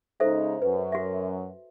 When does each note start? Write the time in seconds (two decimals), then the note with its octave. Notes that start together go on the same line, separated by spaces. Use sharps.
0.20 C#3 G#3 D#4 A4 C5 E5
0.62 F#2 B4
0.92 F#4 E5